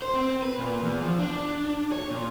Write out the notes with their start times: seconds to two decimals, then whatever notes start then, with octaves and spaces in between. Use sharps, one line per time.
0.02 C5
0.14 C4
0.43 B4
0.58 A#2
0.82 E2
1.01 F3
1.19 D4
1.92 C#5
2.11 A#2